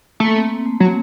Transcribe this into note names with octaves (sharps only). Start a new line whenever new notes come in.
A3 A#3
C4
C4
A3
F#3 A#3